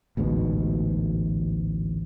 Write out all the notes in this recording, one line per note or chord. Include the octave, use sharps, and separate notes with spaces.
A1 D2 G#2 B2